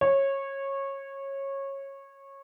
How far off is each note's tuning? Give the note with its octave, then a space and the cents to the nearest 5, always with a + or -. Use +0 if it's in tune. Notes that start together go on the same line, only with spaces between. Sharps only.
C#5 -20